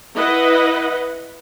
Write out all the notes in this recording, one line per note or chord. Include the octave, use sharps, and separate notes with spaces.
E4 B4 D#5 F#5